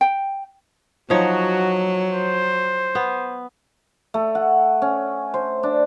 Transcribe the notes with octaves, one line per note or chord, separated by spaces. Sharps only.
G5
F3 F#3 D#4 F#4 C#5
C5
B3
A3
F#5
C#4
C5
D4